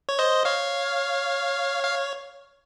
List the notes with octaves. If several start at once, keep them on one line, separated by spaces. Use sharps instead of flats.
C#5
C5 D#5
C#5 F5
F5